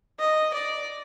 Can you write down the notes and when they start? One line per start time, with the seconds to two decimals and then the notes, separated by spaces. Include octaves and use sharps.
0.19 D#5
0.54 D5